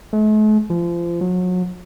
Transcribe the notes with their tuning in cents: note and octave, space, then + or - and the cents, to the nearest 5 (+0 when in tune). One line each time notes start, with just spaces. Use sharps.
A3 -45
F3 -30
F#3 -30